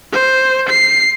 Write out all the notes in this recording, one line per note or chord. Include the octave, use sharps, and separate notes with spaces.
C5
C7